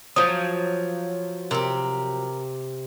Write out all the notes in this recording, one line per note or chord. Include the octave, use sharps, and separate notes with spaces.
F3 F#3 F4 C#5 D#6
C3 G4 A#4